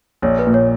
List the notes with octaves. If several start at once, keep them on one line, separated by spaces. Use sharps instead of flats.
A#1 C#5
B4
A#2
C#5